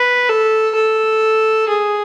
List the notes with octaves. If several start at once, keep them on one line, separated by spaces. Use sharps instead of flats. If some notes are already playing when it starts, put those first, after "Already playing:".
Already playing: B4
A4
A4
G#4